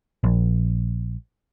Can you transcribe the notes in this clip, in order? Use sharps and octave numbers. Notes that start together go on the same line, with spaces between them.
A#1